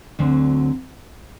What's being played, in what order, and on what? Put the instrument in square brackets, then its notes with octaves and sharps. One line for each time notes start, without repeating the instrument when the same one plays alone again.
[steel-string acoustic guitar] D2 D3 F#3 C4